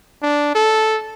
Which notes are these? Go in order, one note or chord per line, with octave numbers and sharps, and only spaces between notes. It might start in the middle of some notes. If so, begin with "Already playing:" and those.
D4
A4